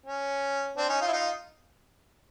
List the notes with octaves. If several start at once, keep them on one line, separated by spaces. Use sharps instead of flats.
C#4
C4 D4
C#4 D#4
D#4 F4
E4
D#4 F4